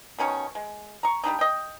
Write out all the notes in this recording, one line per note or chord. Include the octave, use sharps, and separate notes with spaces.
B2 D#3 C#4 C#6
G#3
A#5 C#6
G3 B3 D4 D#4
D#5 G5